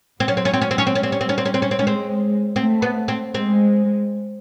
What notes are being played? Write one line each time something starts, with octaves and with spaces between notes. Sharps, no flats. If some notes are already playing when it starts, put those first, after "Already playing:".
F#3 C4
C#4
C4
C#4
C4
C#4
C4
C#4
C4
C#4
G3 C4
C#4
C4
C#4
C4
C#4
C4
C#4
C4
G#3 C#4
C4
A3 C4
B3
C4
G#3 C4